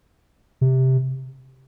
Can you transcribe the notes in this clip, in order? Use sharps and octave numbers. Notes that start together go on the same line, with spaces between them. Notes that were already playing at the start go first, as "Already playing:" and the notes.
C3